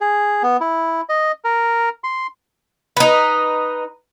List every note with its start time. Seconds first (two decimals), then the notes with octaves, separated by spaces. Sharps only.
0.01 G#4
0.43 B3
0.61 E4
1.09 D#5
1.44 A#4
2.04 C6
2.97 D#4 B4